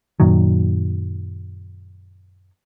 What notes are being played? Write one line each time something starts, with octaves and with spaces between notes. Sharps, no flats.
F#2 A#2 D#3 F#3